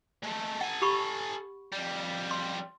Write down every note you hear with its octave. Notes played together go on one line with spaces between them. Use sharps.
G#3 A3
A4 F#5 G#5
G4 B5 C#6
F2 G3
C6